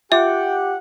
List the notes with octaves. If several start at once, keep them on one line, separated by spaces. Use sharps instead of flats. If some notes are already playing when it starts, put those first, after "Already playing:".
F4 G4 E5 F#5 G5 D6